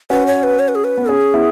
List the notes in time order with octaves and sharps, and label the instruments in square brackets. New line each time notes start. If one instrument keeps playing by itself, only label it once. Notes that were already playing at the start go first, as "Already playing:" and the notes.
[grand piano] C#4 F#4 [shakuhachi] B4
[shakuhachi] C#5
B4
C#5
B4
G#4
B4
[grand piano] B3
[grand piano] C#4 [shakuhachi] G#4
[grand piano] B3 E4